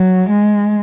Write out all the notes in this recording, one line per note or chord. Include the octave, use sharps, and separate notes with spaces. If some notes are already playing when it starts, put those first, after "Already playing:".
Already playing: F#3
G#3